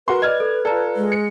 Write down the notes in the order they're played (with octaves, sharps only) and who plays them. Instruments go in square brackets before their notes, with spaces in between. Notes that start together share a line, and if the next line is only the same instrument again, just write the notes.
[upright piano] F#4 A#4 C6 [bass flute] B4
[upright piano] D5 F6 G#6 [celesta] D#5
[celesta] A4
[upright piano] F4 A4 [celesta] D5 A#5
[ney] G#3
[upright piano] C#7